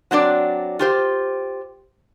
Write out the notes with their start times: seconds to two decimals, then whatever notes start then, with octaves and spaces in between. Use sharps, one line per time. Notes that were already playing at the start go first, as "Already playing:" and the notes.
0.11 F#3 C4 D4 D5
0.79 F4 G4 C5